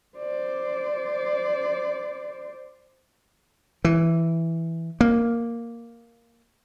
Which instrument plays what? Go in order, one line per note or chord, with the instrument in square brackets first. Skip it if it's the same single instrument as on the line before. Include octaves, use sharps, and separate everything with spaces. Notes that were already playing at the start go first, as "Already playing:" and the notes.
[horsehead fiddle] C5 D5
[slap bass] E3
A#3